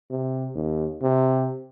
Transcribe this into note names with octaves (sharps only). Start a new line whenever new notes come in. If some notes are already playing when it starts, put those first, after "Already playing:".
C3
D#2
C3